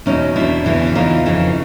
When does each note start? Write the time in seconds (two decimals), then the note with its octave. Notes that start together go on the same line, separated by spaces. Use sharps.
0.06 E2 B2 C#4 D#4
0.36 E2 B2 D4 E4
0.66 E2 C#3 E3
0.95 E2 C#3 E3 D#4 F4
1.26 F2 C#3 E3